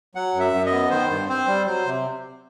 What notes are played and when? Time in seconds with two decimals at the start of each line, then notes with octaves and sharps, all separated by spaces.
0.15 F#3 F#5
0.34 F#2
0.40 E5
0.53 F#2
0.66 D#5
0.71 B3
0.90 D#3 C5
1.10 G2
1.28 C4 C5
1.48 G3
1.66 F#3 C5
1.86 C3